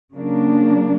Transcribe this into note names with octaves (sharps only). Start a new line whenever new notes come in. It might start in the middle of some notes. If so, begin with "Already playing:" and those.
C#3 F#3 A#3 D4